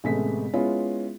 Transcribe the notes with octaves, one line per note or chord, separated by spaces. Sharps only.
A1 C3 G#3 A3 B3 B6
G#3 B3 C#4 E4 F4